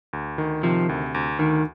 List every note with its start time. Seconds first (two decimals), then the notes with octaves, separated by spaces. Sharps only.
0.13 D2
0.38 D#3
0.63 C3 F3
0.89 D2
1.14 D2
1.39 D2 D#3